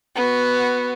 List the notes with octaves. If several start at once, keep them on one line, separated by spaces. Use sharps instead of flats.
B3 F#4